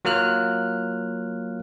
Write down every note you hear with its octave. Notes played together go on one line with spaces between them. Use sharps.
F#3 A#3 F4 F6 F#6